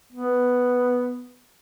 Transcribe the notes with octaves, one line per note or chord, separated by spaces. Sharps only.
B3